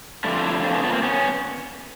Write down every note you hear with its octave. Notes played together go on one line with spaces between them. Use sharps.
F2 D3 F3 A3 D4 E4
F4
D4 E4
C4 D4
B3 C#4
A3 B3
A#3 C4
B3 C#4